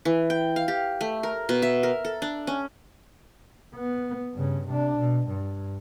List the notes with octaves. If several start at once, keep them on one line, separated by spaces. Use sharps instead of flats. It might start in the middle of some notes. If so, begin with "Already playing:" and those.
E3
G5
F5
G4
A3
A#4
B2
E5
A#4
A4
D4
C#4
B3
G2 C#3
C3 D4
B2
G2